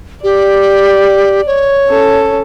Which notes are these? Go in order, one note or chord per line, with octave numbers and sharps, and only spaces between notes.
G4 D5
C#5
C#4 A4